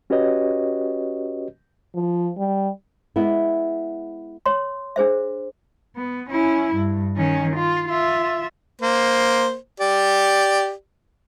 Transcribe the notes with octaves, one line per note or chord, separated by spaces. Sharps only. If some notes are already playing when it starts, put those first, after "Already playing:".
C#4 F#4 G4 B4 C#5 D#5
F3
G3
G#3 B3 E4
C#5 C6
D4 G#4 C5 E5
B3
C#4 E4
G2
D#3 C#4
F4
F4 E5
A#3 C5
G4 D5